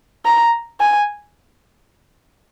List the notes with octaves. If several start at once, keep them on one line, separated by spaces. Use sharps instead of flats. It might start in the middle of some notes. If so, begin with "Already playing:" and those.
A#5
G#5